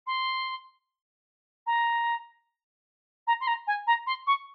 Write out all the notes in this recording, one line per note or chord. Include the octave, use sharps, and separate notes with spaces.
C6
A#5
A#5
C6
A#5
G#5
A#5
C6
C#6